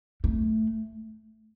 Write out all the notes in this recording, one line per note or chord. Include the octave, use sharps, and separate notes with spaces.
A3